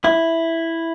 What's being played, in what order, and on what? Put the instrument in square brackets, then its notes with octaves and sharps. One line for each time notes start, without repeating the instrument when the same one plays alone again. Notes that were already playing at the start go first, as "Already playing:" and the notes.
[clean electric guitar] E4